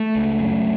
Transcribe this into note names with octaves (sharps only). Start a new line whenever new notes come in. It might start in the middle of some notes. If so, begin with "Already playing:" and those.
Already playing: A3
C#2
F#2